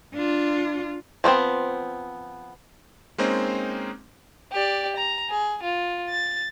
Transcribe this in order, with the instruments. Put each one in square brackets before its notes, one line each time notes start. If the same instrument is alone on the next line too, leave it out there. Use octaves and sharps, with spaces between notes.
[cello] D4 F4
[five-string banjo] F3 A3 B3 C4
[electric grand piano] G#3 A#3 C4 C#4 D#4 C5
[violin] G4 D5
A#5
G#4
F4
A6